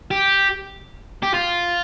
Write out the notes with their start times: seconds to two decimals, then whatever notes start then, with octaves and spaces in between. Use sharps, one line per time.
0.11 G4
1.23 G4
1.34 F4